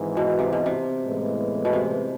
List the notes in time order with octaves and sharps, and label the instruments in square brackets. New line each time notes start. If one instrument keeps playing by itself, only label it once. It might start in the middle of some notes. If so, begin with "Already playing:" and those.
Already playing: [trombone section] G#1 G#2 E3
[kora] B2
C3
B2
C3
[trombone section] A1 A2 E3 G#3 B3
[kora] B2
C3